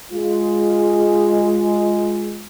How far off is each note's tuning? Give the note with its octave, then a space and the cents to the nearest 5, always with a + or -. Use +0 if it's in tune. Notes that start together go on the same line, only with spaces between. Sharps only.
G#3 +0 F4 +5